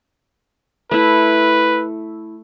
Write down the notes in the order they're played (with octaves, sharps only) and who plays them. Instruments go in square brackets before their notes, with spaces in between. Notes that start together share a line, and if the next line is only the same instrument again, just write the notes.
[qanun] A3 E4 [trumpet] B4